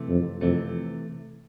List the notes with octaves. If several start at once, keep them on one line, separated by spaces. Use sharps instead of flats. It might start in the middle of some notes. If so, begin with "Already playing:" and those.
Already playing: C3 E3 A3
F2
F2 C3 E3 A3